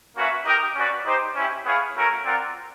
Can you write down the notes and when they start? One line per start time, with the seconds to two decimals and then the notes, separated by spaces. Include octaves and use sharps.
0.16 A#3 C#4 F#4 B4 E5
0.45 D#4 G4 A#4 D#5 G5
0.75 C#4 F#4 B4 D5
1.05 D#4 G4 C5
1.35 C#4 E4 G4
1.65 B3 E4 G#4 C#5 F5
1.96 A3 C#4 F#4 A#4
2.25 C4 F4 A#4 D5 F#5